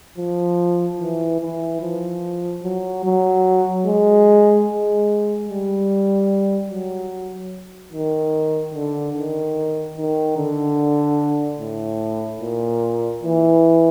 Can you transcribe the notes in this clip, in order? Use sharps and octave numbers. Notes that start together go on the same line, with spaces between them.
F3
E3
E3
F3
F#3
F#3
G#3
G#3
G3
F#3
D#3
D3
D#3
D#3
D3
A2
A#2
E3